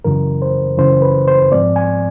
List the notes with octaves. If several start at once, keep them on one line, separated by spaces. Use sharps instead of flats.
F#2 C#3 E3 A#4
C5
F#2 C#3 E3 C5
B4
C5
G#2 F3 G#3 C4 D5
G#5